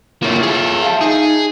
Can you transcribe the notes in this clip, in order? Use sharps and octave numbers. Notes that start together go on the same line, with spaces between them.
A#3 E4 F4 A4 C#5
G#4 E5
F5 A5
D#4 G#4